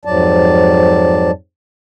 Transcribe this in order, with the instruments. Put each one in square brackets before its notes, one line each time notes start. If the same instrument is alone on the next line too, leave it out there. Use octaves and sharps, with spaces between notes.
[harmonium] F2 G#2 F#3 D5 A5